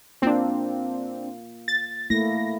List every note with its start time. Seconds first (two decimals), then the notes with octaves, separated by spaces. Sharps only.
0.22 A#3 C4 D4 F4
1.68 A6
2.10 A3 A#3 E4 A#6